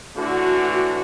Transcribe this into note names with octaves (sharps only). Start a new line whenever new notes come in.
A2 D3 E3 F#4